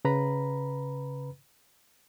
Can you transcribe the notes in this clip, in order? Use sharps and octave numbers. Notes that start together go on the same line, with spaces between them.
C#3 B4 A#5 B5